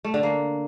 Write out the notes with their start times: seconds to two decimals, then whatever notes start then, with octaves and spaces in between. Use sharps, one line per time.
0.05 A3
0.14 D3
0.23 A#3